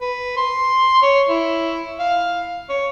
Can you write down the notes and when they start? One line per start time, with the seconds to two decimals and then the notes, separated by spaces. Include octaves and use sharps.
0.01 B4
0.37 C6
1.02 C#5
1.29 E4
1.99 F5
2.69 C#5